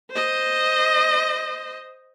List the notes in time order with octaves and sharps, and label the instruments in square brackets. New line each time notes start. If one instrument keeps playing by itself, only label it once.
[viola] C5 D#5